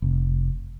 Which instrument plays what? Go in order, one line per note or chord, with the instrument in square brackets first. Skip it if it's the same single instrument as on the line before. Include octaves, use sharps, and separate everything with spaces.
[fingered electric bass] F1